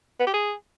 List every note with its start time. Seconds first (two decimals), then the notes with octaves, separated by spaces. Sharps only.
0.20 B3
0.27 G4
0.34 G#4